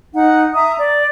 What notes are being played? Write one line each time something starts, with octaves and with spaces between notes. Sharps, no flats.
D#4 F#5
E5 A#5 D#6
D5